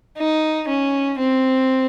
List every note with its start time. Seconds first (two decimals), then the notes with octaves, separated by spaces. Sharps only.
0.18 D#4
0.68 C#4
1.18 C4